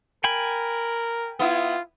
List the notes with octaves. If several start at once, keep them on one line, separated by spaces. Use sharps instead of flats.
A#4 G5 G#5 B5
B3 E4 F4